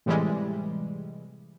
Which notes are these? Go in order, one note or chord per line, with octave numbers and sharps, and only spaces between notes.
A2 C3 E3 G3 G#3